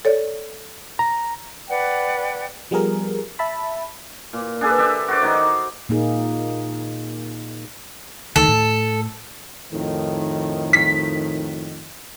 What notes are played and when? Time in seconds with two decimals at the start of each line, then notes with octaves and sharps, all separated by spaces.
0.05 A4 C#5 D5
0.99 A#5
1.67 B4 D5 F#5 G5
2.71 F3 G3 B3 G#4 A#4
3.39 E5 A5 B5
4.33 A#2
4.61 D4 G#4 A4 B4
4.78 D4 G4 A4 E5
5.08 F#4 C5 D5
5.22 D#3 D#4 D#5
5.35 D6
5.89 A#2 A#3 D#4 G#4
8.36 D2 D#3 A4
8.48 A2
9.72 F2 A2 D#3
10.73 B6